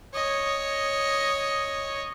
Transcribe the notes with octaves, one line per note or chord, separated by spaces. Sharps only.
C#5 D#5